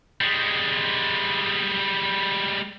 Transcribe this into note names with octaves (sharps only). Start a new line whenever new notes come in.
G3 G#3